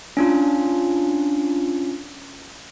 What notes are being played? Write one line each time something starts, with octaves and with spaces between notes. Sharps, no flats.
C#4 D4 F4